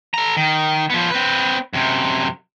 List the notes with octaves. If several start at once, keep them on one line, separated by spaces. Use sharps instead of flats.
A4 A#5
D#3
F3 B3
C4 B4
F#2 C3